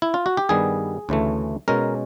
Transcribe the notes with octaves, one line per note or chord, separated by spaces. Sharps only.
E4
F4
F#4
G4
G2 D#3 G3 B3 G#4
D2 C#3 E3 A3
B2 G#3 C#4 A#4